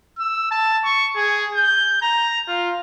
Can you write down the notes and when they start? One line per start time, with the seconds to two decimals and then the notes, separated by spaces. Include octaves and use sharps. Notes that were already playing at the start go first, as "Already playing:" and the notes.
0.18 E6
0.51 A5
0.84 C#6
1.16 G#4
1.55 G6
2.02 A#5
2.48 F4